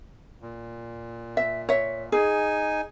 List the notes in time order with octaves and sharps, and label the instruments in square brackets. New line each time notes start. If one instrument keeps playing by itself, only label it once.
[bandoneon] A#2
[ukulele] E5
C#5 E5
[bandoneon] D#4 G#5 [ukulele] G#4